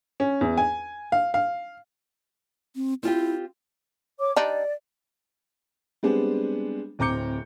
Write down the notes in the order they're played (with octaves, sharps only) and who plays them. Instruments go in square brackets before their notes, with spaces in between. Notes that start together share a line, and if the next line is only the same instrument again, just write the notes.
[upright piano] C#4
E2
G#5
F5
F5
[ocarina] C4
[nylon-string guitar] C4 F4 G4 [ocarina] E4
[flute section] C#5 D6
[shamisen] G3 D4 D#4 [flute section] D5
[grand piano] G3 G#3 B3 C4 D4 G#4
D1 C4 A#5 D6 G6 C#7